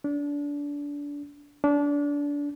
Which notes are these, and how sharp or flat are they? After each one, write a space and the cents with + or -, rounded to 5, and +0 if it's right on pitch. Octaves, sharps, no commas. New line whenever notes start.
D4 -25
D4 -25